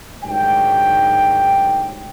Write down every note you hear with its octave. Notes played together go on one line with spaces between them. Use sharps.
D2 G#2 D#3 F#3 G4 G5